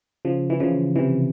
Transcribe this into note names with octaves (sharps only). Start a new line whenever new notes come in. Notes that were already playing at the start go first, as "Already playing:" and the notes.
C#3 F3
E3
C#3 F3
C3 E3